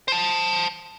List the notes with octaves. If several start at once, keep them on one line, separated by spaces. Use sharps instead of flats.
C5 A5